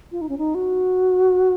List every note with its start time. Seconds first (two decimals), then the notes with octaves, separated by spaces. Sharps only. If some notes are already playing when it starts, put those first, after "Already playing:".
0.12 F4
0.21 D#4
0.29 C#4
0.38 D#4
0.55 F#4